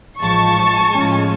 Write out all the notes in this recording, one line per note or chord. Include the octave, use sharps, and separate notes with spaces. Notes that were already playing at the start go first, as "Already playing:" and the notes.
A1 G#2 F3 G#3 A5 C#6
A2 F3 G#3 C#4